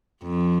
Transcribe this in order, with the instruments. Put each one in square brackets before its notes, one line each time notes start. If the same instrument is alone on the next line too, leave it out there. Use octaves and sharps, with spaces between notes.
[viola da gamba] F2